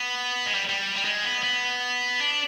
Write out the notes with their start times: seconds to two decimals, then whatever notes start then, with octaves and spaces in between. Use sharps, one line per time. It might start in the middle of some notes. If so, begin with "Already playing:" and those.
Already playing: B3
0.46 G#3
0.54 G3
0.69 G3
0.96 G3
1.04 G#3
1.24 B3
1.43 B3
2.21 D4